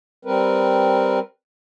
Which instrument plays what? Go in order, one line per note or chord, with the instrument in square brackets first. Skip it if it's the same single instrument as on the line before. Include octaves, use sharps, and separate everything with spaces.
[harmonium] G3 C4 A#4 B4